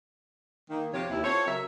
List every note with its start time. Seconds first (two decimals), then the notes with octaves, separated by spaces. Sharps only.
0.70 D#3 A#3
0.93 F2 C3 F3 F4 G4 C#5
1.10 D#2 E4
1.24 C4 F4 A4 C#5
1.47 C#3 F#3 A#4 E5